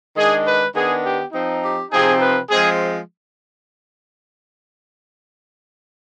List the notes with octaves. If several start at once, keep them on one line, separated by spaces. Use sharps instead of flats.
D#3 G#3 D4 G#4
B4
D#3 B3 D4 G#4
G4
F3 C4 D#4
G4
C3 F3 C4 D#4 G#4
B4
F3 G#3 C4 G#4